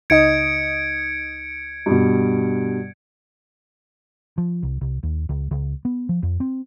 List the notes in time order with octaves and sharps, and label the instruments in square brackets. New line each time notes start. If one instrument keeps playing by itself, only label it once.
[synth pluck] C#2 D#4 D#5 [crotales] G#6 C#7 D7
[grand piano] G2 B2
[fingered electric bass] F3
C2
C2
D#2
C#2
C#2
B3
F3
F2
C4